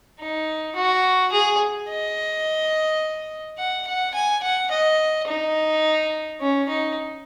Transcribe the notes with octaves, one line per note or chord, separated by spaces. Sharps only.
D#4
F#4
G#4
D#5
F#5
F#5
G#5
F#5
D#5
D#4
C#4
D#4